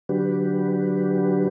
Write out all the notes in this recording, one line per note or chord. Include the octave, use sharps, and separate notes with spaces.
D3 F#3 D4 F#4 G4 B4